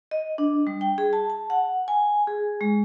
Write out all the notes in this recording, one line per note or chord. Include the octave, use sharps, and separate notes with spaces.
D#5
D4
G3
G5
G#4
A5
A5
F#5
G#5
G#4
G#3